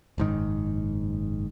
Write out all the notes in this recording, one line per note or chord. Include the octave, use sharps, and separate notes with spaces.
F#1 G#2 D#3